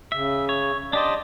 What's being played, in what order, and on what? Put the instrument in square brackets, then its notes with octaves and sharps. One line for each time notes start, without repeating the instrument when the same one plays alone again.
[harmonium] C#3 [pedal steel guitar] E5
[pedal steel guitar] C#5
[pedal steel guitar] D4 G4 C5 [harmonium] D5 D#5